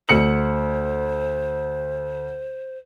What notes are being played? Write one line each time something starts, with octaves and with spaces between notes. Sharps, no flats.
D2 C5 C#7 F#7